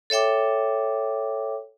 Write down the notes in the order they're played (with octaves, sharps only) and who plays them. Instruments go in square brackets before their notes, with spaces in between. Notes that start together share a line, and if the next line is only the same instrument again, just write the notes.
[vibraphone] A4 C#5 E5 G5 D6